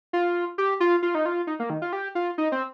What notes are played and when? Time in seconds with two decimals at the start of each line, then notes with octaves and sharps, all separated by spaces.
0.13 F4
0.58 G4
0.80 F4
1.03 F4
1.15 D#4
1.26 F4
1.47 D#4
1.60 A#3
1.70 D#3
1.82 F4
1.93 G4
2.15 F4
2.38 D#4
2.52 C4